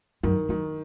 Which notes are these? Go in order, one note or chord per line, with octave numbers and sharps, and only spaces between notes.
F#2 D#3
F#2 D#3